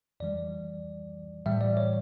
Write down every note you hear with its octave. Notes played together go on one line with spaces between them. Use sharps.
F2 E3 G3 D5
A2 E3 G3 E5
D5
C#5